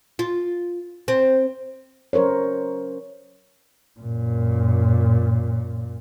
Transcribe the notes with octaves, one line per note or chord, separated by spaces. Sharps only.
F4
C4
F#3 C#4 A#4 C5 C#5
F#2 A#2